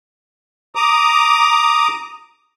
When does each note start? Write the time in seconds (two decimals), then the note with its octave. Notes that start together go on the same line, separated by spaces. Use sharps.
0.75 A#5 D6 D#6